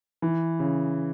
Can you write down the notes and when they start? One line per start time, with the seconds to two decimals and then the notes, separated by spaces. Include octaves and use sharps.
0.22 E3
0.60 C#3